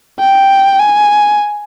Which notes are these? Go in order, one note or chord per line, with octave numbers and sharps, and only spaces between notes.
G5
G#5